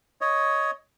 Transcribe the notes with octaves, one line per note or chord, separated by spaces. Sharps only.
C#5 D#5